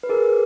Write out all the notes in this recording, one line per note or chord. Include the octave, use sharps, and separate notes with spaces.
B4
G#4 A#4